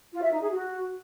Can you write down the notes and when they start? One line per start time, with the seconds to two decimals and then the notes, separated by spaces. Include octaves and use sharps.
0.13 F4
0.22 E5
0.32 D#4
0.42 G#4
0.51 F#4